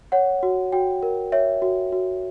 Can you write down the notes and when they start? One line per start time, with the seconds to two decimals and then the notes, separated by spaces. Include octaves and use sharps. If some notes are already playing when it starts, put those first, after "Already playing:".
0.12 C#5 F#5
0.43 F#4
0.72 F#4 G5
1.03 A#4
1.32 C#5 E5
1.62 F#4
1.92 F#4